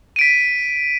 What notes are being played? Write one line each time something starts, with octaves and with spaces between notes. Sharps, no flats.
B6 D7 D#7